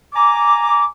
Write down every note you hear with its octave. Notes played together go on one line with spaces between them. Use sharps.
G#5 A#5 D6